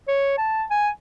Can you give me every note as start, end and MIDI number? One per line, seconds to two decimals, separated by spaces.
0.08 0.37 73
0.38 0.64 81
0.70 0.89 80